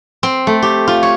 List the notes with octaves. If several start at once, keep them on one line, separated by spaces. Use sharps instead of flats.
C4
A3
G4
F4
C#5